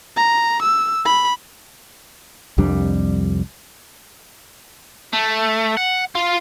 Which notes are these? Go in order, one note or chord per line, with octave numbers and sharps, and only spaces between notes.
A#5
E6
B5
C2 F2 G3 D4
A3
F#5
F4